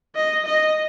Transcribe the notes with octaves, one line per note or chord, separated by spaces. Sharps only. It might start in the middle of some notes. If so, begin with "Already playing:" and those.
D#5
D#5